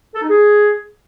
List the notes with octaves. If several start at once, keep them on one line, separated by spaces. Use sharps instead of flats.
A4
D#4
G#4